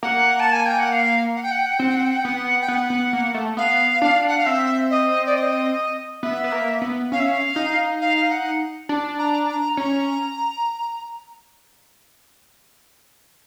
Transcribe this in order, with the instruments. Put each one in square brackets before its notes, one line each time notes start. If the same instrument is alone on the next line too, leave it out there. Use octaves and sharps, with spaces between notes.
[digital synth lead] A#3 [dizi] F#5
[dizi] A5
G#5
G5
F#5
F5
F#5
G5
F#5
G5
F#5
G5
[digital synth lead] C4 [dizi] F#5
[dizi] G5
F#5
G5
F#5
G5
[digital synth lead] B3 [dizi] F#5
[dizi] G5
[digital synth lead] B3 [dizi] F#5
[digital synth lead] B3
A#3
A3
[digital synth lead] B3 [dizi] F5
[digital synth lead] D4
[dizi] F#5
F5
[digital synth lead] C4 [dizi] E5
[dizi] D#5
D5
D#5
[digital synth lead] B3 [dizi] E5
[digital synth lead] B3
A#3
B3
[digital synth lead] C#4 [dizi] F5
[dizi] E5
F5
[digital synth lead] D#4
[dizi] F5
F#5
[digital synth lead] D4
[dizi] A#5
A#5
[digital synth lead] C#4 [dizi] A#5